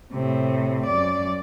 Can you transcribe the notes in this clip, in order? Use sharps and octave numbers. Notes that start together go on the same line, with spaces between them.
A2 C3
F#2 D5